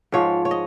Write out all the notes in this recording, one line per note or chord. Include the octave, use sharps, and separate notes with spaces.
G#2 F3 G#3 C#5
C#5
D#5